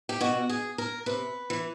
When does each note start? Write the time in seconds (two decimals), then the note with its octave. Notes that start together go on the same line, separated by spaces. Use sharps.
0.09 G4
0.21 B2 F#4
0.49 G#4
0.78 A#4
1.06 C3 B4
1.50 E3